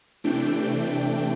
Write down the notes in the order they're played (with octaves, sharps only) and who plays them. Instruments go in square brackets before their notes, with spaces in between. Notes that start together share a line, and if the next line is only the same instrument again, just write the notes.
[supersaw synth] C3 E3 A3 D4 G5